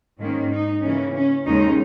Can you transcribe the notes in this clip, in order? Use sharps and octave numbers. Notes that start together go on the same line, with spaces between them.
G#2 D#3 A#3 C#4
D#4
C#3 E3 A#3 C#4
C#4
D#2 C#3 G#3 C#4 D#4